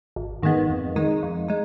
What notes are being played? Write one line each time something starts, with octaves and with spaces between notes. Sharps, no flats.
G#1
G#2 D#3 G#3 B3
F2
D#3 G#3 D#4
F2
G#3 D#4